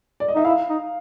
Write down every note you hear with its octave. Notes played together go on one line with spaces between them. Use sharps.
D5
D#5
D#4 E5
E4 F5
D#4